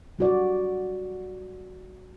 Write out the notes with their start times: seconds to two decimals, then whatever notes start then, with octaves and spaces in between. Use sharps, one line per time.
0.19 G3 F#4 D5